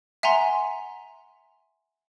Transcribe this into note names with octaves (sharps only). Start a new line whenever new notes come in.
E5 F#5 G#5 A#5 C6